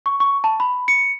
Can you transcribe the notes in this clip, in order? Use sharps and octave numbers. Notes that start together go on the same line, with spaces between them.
C#6
C#6
A5
B5
C#7